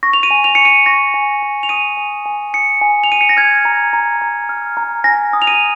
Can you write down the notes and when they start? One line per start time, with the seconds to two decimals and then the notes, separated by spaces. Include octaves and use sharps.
0.03 C#6 A#6
0.13 F7
0.23 D#7
0.31 G#5
0.44 F7
0.55 C#6 C#7
0.65 D#7
0.86 C#6 A#6
1.14 G#5
1.42 G#5
1.63 F7
1.69 D#6 D#7
1.97 G#5
2.26 G#5
2.54 D#6 C#7
2.81 G#5
3.04 F7
3.09 G#5 D#7
3.21 C#7
3.29 A#6
3.37 F6 G#6
3.65 A#5
3.93 A#5
4.22 A#5
4.49 F6
4.77 A#5
5.04 G#5 A#6
5.33 D#6
5.42 F7
5.47 D#7